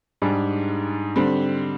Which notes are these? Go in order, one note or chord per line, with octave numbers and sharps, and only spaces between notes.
G#2 G3 D4 G#4
D3 G3 C4